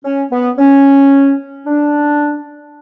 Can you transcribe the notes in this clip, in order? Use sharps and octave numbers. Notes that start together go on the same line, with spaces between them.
C#4
B3
C#4
D4